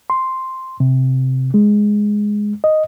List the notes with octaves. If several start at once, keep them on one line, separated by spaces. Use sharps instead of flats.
C6
C3
G#3
D#5